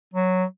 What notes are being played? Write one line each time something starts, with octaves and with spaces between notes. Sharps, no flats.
F#3